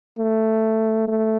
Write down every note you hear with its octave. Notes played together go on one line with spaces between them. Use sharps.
A3
A3